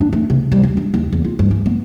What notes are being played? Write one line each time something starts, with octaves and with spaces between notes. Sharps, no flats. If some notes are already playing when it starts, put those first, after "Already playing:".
D4
A3
C3
G3
D#2
D4
D#2
E2
F4
G2
E3
B3